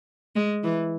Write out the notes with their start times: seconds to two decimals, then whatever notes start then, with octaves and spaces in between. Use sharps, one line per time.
0.36 G#3
0.64 E3